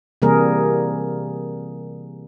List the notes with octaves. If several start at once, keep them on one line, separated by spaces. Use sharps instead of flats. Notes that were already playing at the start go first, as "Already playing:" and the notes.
C3 E3 G3 A#3 G#4 A#4